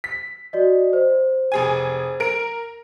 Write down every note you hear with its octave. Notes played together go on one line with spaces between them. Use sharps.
B6
F#4 D5 D#5
C5
F1 G#4 G#5
A#4 D7